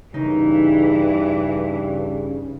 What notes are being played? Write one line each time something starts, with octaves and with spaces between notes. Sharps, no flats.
G2 C#3 E3 D#4